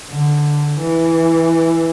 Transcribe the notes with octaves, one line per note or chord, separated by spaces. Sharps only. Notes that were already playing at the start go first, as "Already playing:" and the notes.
D3
E3